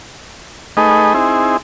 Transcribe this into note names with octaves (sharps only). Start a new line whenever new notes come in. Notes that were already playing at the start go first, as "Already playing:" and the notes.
A3 D#4 G#4 B4 D#5
C4 D#4 E4 G#4